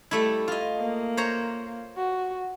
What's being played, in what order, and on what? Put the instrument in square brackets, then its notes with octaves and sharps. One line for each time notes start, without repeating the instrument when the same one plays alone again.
[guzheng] G3 A3 E4
F4 D#5
[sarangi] A#3
[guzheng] C5 C#5 A#5
[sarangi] F#4